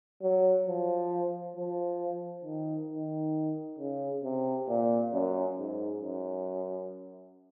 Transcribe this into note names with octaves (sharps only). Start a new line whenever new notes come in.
F#3
F3
F3
D#3
D#3
C#3
C3
A#2
F#2
G#2
F#2